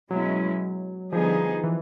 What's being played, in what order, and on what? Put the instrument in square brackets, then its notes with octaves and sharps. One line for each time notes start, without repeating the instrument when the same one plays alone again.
[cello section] B2 G#3 C#4 E4 [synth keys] F#3
[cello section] D3 G3 B3 D#4 G#4 [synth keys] F3
[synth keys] E3